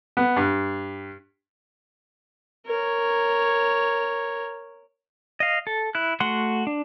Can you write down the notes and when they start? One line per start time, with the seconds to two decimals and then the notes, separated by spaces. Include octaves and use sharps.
0.17 B3
0.37 G2
2.66 A#4 C#5
5.40 D#5 F5
5.67 A4
5.95 E4 F#6
6.20 A3 F#4 F#5 C6 F#6
6.67 D4